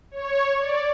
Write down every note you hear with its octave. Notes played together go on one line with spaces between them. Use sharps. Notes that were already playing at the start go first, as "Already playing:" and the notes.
C#5
D5